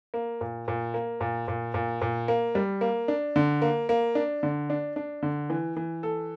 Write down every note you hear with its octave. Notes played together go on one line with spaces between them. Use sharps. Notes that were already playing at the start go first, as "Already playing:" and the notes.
A#3
A#2
A#2
A#3
A#2
A#2
A#2
A#2
A#3
G3
A#3
D4
D3
A#3
A#3
D4
D3
D4
D4
D3
E3
E3
A4